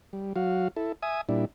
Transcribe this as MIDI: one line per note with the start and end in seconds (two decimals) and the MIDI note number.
0.13 0.33 55
0.36 0.68 54
0.36 0.68 66
0.36 0.68 77
0.76 0.92 64
0.76 0.92 69
1.02 1.21 76
1.02 1.21 80
1.02 1.21 87
1.29 1.45 46
1.29 1.45 55
1.29 1.45 62
1.29 1.45 64